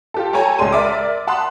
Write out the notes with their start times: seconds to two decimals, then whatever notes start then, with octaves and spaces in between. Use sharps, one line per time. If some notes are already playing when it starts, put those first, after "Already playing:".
0.14 F4 G4 A4
0.33 A4 C#5 G5 G#5 A#5
0.58 C#2 G#3 D5 C6 D#7
0.72 A#4 D5 E5 D6
1.27 F#5 A5 B5 C6 D#6 F#6